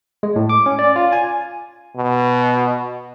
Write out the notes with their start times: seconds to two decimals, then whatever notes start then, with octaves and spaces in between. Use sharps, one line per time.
0.23 G#3
0.36 A2
0.49 D6
0.66 C#4
0.79 D5
0.96 F4
1.12 G#5
1.97 B2